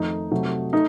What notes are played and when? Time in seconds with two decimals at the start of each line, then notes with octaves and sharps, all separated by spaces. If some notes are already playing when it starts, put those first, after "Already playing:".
Already playing: F2 D#3 A3 D#4
0.31 C3 F#3 A3
0.73 A3 D#4